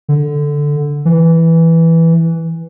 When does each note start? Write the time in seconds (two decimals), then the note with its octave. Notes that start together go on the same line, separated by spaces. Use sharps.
0.09 D3
1.05 E3